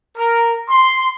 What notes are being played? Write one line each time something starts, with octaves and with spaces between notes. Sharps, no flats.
A#4
C6